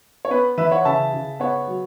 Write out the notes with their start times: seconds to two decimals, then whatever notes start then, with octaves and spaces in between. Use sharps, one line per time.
0.25 C#5
0.31 B3 B4
0.57 E3 B4 E5
0.72 C#5 F#5
0.85 C#3 E5 A5
1.13 C#3
1.40 B3 C#5 F#5
1.67 F#3